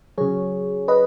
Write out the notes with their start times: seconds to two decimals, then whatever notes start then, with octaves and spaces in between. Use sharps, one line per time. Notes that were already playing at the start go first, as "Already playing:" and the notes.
0.18 C#3 F#3 G#4 C#5
0.88 B4 D#5